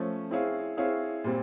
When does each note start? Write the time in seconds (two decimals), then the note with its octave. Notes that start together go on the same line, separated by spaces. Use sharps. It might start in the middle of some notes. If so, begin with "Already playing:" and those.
Already playing: F3 A3 C#4
0.31 C4 E4 G#4 C#5 F5
0.77 C4 E4 G#4 C#5 F5
1.24 A#2 G3 C4